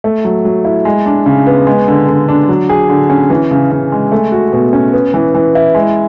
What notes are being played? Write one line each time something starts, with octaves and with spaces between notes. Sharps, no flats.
A3
F#3
F#3
E4
G#3
D4
C#3
B3
G#3
D3
D3
D4
F#3
G#4
D3
C#4
E3
C#3
C#3
G#3
A3
F#4
B2
C#4
B3
E3
E3
E4
G#3